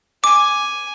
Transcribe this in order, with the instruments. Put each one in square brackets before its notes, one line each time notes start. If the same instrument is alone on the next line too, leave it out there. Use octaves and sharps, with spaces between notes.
[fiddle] G#5 [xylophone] D6